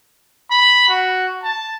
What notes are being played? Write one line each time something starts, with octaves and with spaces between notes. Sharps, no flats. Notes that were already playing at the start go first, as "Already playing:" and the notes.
B5
F#4
A5